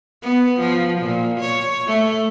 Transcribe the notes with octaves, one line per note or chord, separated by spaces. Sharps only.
B3
F3
A#2
C#5
A3